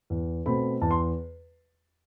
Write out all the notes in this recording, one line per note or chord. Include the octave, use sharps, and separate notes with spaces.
E2
B2 A3 C4 B5
E2 A5
C6